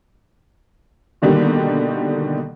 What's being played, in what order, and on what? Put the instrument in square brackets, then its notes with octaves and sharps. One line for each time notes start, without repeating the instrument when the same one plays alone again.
[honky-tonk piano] B2 D3 D#3 G3 A#3